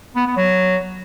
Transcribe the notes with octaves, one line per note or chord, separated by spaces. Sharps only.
B3
B3
F#3